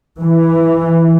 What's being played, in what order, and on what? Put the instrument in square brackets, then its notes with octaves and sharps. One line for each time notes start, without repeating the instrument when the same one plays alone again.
[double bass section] E3